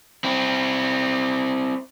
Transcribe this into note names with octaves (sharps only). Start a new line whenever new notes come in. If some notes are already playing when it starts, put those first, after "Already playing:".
C4 E4